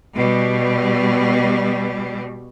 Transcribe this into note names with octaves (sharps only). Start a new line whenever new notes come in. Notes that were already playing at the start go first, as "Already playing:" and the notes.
B2 G3